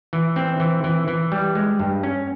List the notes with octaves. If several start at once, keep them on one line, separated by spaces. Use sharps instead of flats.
E3
C4
E3
E3
E3
G3
G#3
G2
C#4